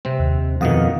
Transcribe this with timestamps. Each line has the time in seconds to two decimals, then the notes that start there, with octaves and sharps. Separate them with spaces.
0.05 C3 C4
0.19 D#2
0.61 F2 B2 D#3 F5 F#5 D#6